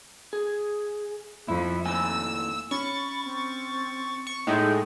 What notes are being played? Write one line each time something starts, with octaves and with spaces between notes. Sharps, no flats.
G#4
F2 E4
D#2 A2 G#5 E6
C#4 B5 C#6 A6
C4
C#6
A2 G#3 A3 D#4